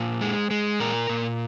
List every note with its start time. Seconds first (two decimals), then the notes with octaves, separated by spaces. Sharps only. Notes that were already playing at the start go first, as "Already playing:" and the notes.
Already playing: A#2 C5
0.21 G#3
0.51 G#3
0.80 A#2 A#4
1.09 A#2